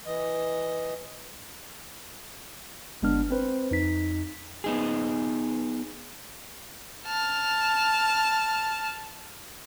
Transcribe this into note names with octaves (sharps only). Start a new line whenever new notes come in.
E3 D#5
G1 G#3 B3 D4 F6
C4 B4 C5
F2 D#4 B6
B3 D#4 G#4
A5 F6